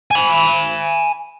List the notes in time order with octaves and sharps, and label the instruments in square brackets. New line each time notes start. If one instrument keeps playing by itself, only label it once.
[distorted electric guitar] G#5 B5